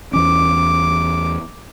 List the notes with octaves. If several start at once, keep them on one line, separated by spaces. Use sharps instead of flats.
E2 E3 C#4 D6